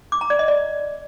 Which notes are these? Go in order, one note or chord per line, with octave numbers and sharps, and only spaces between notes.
D6
A#5
D5
D#5
D5